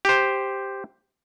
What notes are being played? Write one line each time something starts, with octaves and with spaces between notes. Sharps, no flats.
G4 C5